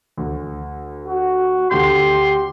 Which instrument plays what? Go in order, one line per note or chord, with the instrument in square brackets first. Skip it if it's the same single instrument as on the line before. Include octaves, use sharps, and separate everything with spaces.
[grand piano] D2
[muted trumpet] F#4
[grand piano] D2 D3 G6 [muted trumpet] G4 [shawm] C6